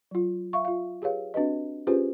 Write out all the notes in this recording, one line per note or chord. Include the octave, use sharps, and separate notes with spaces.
F#3 F4
E5 F5 C#6
F4 F5
G4 G#4 B4 C#5 F5
C4 D4 F#4 B4 D#5
C#4 F4 G4 G#4 B4 C5